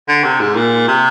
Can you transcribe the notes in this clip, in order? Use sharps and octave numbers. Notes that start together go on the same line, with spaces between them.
D3
C3
G#2
A#2
C3